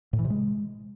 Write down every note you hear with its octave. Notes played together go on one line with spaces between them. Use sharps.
A2
E3
C3
G#3